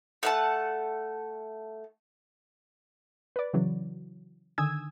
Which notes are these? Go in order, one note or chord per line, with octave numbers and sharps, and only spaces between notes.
A3 F#5 A5
B4 D5
C#3 E3 F#3
D3 D#3 G#5 D#6 E6 G#6